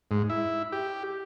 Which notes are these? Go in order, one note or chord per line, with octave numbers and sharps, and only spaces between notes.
G#2
E4
G4